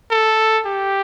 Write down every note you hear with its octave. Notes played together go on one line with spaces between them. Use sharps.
A4
G4